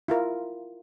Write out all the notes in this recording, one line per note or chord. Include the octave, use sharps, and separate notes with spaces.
E4 F4 A#4